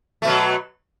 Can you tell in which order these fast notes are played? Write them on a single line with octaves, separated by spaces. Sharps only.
A3 B2 F#3